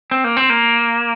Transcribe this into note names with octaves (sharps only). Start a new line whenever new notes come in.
C4
A#3
C4
A#3